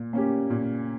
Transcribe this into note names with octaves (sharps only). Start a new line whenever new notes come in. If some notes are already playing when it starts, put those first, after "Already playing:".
Already playing: A#2
A#3 C#4 G4
A#2